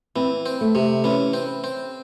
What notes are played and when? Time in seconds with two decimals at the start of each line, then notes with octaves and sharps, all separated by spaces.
0.16 E3 C4
0.46 C4
0.61 A3
0.75 C3
1.04 E3 C#4
1.34 C4
1.64 C4